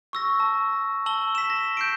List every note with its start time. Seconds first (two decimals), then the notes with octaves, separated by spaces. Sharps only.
0.13 C#6 E6 A#6
0.40 A5
1.06 A5 E6 F#7 G7
1.35 B6 E7
1.50 A#6
1.77 G6 C7 D7